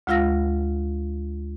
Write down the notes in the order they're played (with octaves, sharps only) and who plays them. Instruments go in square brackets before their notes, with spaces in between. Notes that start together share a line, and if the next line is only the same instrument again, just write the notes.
[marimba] D2 G#3 F4 F5 E6 A#6